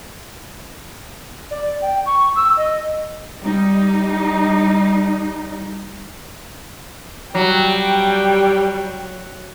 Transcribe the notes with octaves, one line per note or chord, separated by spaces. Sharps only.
D5
G5
C#6
E6
D#5
G3 D#4
F#3 G3 G5